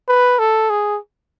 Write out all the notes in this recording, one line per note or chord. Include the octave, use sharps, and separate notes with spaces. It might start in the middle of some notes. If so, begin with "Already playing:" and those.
B4
A4
G#4